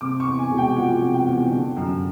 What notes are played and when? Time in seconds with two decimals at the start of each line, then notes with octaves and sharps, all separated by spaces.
0.01 C3 D6
0.20 C#6
0.26 E2
0.39 G#5
0.51 E1
0.58 G5
0.76 F3 F#5
1.01 C3
1.14 G5
1.26 E2
1.51 D3
1.77 F#2